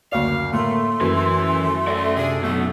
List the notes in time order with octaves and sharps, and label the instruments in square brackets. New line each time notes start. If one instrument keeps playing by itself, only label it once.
[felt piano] F#1 D2 D5 [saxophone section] C#5 F5
[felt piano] A2 A#3 [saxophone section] A3 [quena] C6
[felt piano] F#2 [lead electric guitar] E3 B4
[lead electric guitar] D5 E5
[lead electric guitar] C3 [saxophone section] D4 G#4 [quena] A4
[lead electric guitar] B1 B2 [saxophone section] D3 F#3 A3